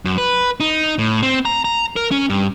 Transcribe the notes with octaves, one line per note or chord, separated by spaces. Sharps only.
F#2
B4
D#4
A2
C4
A#5
A#5
A#4
C#4
G2